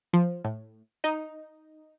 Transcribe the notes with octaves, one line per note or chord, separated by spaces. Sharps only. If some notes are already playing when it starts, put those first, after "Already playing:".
F3
A2
D#4